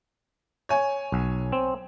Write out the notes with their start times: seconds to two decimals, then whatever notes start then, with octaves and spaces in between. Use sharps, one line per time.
0.69 C#5 G#5
1.12 B1
1.52 C4